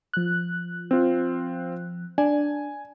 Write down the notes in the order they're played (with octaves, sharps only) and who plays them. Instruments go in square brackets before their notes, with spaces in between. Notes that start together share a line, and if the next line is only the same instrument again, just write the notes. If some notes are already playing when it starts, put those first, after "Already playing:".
[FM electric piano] F3 F#6
[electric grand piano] C4 F4
[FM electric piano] D4 [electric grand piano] G#5